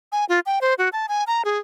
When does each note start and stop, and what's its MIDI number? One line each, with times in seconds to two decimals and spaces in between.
0.12 0.25 80
0.29 0.40 65
0.46 0.59 79
0.61 0.74 72
0.78 0.89 66
0.93 1.06 81
1.08 1.24 80
1.27 1.42 82
1.45 1.58 68